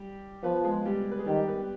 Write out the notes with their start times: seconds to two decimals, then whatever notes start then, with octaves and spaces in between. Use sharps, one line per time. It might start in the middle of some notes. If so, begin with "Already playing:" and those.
Already playing: G3 G4
0.43 F3 B3 B4
0.64 G#3 G#4
0.85 G3 G4
1.11 B4
1.19 G#4
1.26 D#3 G3 G4
1.47 B3 B4